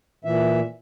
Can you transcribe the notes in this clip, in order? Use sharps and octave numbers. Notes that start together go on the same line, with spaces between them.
A#2 E3 E5